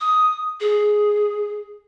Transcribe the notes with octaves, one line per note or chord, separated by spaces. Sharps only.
D#6
G#4